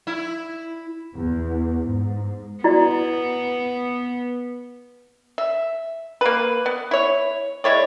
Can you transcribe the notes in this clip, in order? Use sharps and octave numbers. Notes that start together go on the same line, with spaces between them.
E4
E2
G#2
B3 E4 F#4 D5
E5
A#3 B4
B3
E4 C#5
G#3 E4 C#5 D5